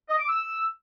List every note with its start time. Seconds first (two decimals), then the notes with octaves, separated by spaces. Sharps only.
0.09 D#5
0.19 D6
0.29 E6